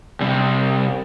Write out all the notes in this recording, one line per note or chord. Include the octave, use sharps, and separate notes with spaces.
C2 C3